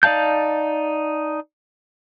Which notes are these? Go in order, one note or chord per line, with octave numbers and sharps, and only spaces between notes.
D#4 D5 F5 A5 G6